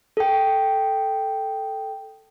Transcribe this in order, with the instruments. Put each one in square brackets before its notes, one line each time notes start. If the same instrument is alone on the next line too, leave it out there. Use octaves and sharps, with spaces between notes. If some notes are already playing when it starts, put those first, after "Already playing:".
[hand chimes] A4 G5